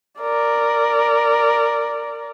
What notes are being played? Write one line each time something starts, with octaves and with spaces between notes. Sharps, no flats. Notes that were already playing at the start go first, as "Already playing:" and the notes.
A#4 D5